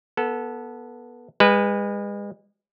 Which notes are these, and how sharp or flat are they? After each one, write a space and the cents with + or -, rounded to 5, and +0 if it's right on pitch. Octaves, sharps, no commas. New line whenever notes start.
B3 -20 A4 +0
G#3 -35 B4 +0